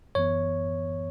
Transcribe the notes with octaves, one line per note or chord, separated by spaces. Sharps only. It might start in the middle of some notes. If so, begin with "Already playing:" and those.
F#2 E3 B3 C#5